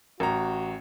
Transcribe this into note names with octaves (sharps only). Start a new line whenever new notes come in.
A1 F#4 A#5